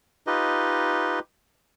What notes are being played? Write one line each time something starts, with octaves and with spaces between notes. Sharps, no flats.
D#4 F4 G4 B4 D#5